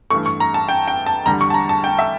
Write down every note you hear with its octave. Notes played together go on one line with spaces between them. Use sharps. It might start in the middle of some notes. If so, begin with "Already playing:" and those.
G2 E3 A3 C#6
C#6
A#5
A5
G5
G5
A5
E2 D3 G3 A#5
C#6
A5
A#5
A5
G5
E5